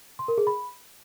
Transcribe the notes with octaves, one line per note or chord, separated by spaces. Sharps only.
C6
A#4
G#4
B5